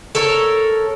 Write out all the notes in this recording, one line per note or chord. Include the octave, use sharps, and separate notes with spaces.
A4 A#4 C#5